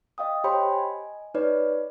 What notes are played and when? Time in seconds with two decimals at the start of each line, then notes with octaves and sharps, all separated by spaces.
0.18 D#5 F5 G5 D#6
0.44 G4 C5 C#5 G5 B5 C6
0.69 D#5 G#5
1.34 D#4 B4 C#5 D5